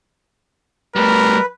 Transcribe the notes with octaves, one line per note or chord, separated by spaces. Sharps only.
G3 A3 A#4 B4